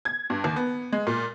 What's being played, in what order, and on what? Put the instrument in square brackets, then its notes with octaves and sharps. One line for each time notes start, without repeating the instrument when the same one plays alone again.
[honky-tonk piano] G#6
G2
D#2
B3
G#3
A#2